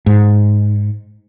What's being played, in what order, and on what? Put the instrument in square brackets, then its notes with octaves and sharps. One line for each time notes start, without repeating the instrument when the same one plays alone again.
[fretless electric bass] G#2